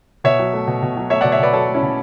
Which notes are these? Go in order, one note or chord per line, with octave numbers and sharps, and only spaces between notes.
B2 C#5 E5
F#3
A3
B2
B2
F#3
A3 C#5 E5
D5 F#5
B2
C#5 E5
B2 B4 D5
F#3 A4 C#5
A3
C#4 E4
B2